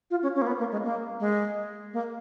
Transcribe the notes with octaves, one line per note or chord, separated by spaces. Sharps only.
F4
C#4
C#4
A#3
B3
A#3
G#3
A#3
G#3
A#3